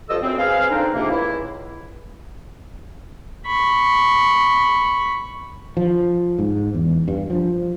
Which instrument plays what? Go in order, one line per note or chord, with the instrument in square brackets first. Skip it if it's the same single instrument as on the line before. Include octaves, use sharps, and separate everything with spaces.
[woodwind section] G2 F3 A4 D#5 E6
F#2 C4
G#4 B4 C5 F5
D3 C4 D4 D#4
F2 G#2 C3 A#3
C#2 E4
[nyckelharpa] B5 C#6
[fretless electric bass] F3
G#2
E2
G2
F3